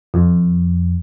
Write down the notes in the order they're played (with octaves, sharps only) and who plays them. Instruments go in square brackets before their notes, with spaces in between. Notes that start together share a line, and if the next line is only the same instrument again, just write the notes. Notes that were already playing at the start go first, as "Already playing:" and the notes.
[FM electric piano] F2